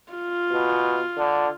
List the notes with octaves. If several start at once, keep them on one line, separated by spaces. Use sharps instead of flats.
F4
B2
D3